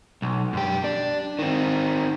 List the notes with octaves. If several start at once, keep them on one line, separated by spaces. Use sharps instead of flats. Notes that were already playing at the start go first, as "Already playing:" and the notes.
B1
F#2 G4
D4
D#3 C4